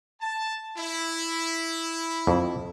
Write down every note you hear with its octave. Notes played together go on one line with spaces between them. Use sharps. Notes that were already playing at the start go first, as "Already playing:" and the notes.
A5
E4
F2